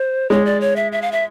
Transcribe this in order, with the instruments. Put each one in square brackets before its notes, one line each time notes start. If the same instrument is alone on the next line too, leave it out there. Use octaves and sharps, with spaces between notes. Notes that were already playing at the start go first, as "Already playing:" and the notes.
Already playing: [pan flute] C5
[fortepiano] G#3 [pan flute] C#5
[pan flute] D5
C#5
E5
E5
F5
E5